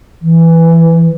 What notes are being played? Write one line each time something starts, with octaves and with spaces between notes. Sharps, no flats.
E3